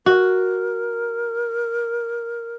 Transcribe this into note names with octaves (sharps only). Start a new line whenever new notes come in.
F#4 A#4